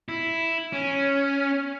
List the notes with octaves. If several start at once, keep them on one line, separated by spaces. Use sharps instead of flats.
E4
C#4